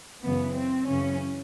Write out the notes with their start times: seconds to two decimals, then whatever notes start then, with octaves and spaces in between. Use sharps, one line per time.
0.24 F#2 C#3 E3 B3
0.57 C4
0.89 F#2 C#3 E3 C#4